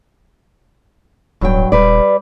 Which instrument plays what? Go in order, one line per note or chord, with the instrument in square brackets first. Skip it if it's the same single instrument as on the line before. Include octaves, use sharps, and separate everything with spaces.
[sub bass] D1 [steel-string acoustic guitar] G2 F#3 G5
[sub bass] D#1 [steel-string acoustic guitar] G3 B4 D5